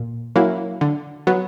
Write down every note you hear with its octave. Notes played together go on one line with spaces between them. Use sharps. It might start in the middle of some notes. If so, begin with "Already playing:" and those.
Already playing: A#2
F#3 A#3 C#4 E4
D3
F#3 B3